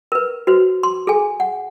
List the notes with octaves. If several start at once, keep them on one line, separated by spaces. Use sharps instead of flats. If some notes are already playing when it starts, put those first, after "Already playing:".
A#4 B4
F#4 B4 C5
C6
G#4 A4 G#5
F#5